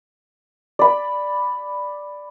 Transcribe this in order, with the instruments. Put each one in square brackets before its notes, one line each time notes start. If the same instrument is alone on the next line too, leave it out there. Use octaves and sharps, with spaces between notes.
[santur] D5 B5